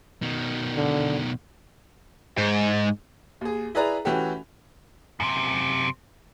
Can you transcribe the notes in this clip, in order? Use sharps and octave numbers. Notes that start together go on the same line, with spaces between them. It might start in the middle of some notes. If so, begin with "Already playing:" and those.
B2 D#3
D3
G#2
D#2 G#4
E4 G#4 B4 D5 A#5
E3 A3 C#4 F#4 G4 A4
F#2 C3